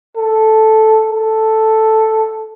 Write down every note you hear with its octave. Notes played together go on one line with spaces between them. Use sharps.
A4
A4